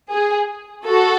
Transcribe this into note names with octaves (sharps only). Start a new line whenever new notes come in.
G#4
F#4 A4